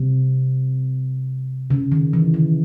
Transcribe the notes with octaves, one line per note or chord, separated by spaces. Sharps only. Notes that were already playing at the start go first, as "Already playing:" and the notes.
Already playing: C3
C#3
D#3
E3
D#3